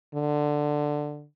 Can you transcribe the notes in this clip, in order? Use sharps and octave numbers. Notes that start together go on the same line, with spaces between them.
D3